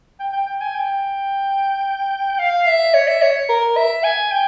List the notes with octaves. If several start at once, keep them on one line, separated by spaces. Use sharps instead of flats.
G5
G5
G5
G#5
G5
F5
E5
C#5
E5
C#5
A#4
E5
G#5
G5